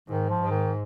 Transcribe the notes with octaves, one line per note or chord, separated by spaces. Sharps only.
G#2 D#3
F3
G#2
D#3